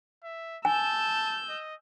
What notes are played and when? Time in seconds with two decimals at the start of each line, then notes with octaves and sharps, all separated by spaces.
0.24 E5
0.65 G#5 A5 E6 G6
1.49 D#5